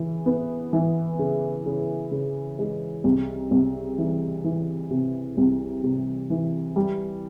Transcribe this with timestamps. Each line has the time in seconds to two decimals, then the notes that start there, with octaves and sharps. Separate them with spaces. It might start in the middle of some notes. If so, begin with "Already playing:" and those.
Already playing: C#3 E3
0.26 B3
0.73 E3
1.19 C#3
1.66 C#3
2.11 C#3
2.59 G#3
3.04 C2
3.51 C2
3.98 E3
4.44 E3
4.91 C3
5.37 C2
5.84 C3
6.30 E3
6.76 G3